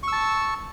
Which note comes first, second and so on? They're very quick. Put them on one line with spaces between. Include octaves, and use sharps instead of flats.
C#6 E6 A5